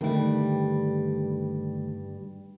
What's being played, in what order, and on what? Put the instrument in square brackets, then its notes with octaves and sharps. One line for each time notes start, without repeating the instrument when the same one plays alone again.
[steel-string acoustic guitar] G2 G3 [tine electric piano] D3 D#3 A3